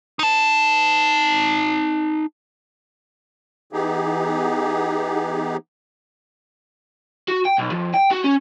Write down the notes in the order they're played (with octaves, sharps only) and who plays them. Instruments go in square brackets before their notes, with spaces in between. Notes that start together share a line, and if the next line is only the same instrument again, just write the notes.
[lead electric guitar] D#4 A5
[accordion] E3 B3 D#4 G4 G#4
[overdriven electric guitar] F#4
G5
B1
F2
G5
F#4
C#4